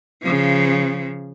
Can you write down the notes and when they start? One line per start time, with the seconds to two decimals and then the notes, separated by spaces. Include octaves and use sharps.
0.22 C#3 F3